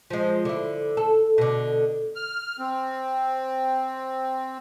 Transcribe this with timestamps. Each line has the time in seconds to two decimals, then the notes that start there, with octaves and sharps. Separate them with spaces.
0.10 F3 G#3
0.45 D3 E4
0.97 A4
1.38 B2 D3
2.15 F6
2.59 C4